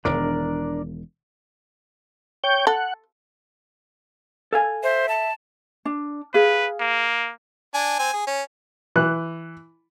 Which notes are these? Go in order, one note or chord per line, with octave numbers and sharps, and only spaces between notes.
E1 E2 D#3 D4 A#4 D5
C#5 G5 G6
A4 F#5
A4 F5 G#5
C5 E5
A5
D4
G#4 B4 F5
A#3
D4 G#5
C4 G#5
G#4
C#4
E3 F#6